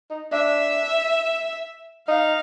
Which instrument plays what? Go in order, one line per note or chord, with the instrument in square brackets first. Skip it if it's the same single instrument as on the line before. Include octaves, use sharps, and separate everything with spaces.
[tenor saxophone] D#4
[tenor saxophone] D4 [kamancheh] E5
[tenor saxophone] D#4 [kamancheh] F5